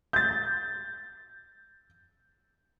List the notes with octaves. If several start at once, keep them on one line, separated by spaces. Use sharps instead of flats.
G6 A6